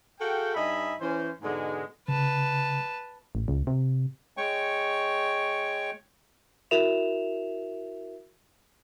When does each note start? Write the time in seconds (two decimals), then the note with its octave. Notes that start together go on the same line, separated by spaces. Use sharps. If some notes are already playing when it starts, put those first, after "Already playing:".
0.21 F#4 G#4 A4 F5 G5
0.55 G2 D#4 D#5 E5 G#5 B5
1.01 E3 C#4 C5
1.42 G#2 B2 D3 G#3
2.08 C#3 B4 A5
3.35 A1
3.48 C#2
3.67 C3
4.37 G#3 C#5 G5 C#6
6.71 E4 F#4 A#4 E5 E7 F7